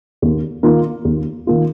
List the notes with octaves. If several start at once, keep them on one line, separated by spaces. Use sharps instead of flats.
D#2
D#3 A#3 F4
D#2
D#3 A#3 F4